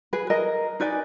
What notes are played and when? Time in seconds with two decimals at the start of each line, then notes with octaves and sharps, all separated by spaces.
0.13 G#4 B4
0.30 A#4 D#5
0.80 D#4 B4 D5 G#5